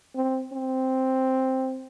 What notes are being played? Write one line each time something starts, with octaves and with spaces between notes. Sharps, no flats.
C4
C4